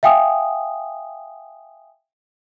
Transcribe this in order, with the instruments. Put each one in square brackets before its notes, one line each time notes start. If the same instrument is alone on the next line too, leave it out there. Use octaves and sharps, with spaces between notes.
[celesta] E5 F5 G5 G#5 D#6